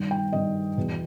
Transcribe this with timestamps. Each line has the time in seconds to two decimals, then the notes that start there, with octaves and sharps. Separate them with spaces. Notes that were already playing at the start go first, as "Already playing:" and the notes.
Already playing: G2 D#3
0.11 G5
0.33 G2 D#3 D#5
0.77 E2 B2